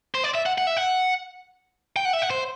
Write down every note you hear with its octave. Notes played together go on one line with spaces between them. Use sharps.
C5
D5
E5
F#5
F#5
E5
F#5
G5
F#5
E5
F#5
C5